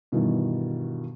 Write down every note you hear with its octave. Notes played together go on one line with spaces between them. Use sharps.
G2 B2 D#3 E3